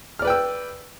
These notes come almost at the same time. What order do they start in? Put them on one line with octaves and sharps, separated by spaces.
F6 D5 B4 G5 E6